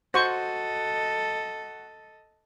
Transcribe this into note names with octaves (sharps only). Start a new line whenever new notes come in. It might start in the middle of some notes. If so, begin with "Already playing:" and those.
F#4 A4 C5 D#5 C#6